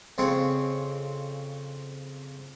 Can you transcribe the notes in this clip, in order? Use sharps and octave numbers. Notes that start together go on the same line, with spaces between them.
F2 C#3 C4